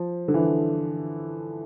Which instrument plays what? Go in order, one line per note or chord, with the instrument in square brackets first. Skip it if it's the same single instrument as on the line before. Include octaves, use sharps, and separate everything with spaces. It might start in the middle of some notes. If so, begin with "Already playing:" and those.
Already playing: [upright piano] F3
D3
E3